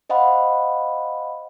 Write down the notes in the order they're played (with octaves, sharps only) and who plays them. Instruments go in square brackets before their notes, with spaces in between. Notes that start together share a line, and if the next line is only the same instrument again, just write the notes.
[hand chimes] C5 D#5 F5 F#5 B5